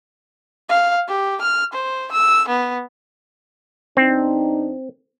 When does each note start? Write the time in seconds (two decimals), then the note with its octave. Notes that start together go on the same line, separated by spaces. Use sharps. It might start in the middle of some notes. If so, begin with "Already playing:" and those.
0.69 F5
1.08 G4
1.41 F6
1.73 C5
2.12 E6
2.49 B3
3.97 E2 C4 D4 D#4